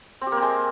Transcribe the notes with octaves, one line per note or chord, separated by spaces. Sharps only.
C4
G4
A#3
C4
G#3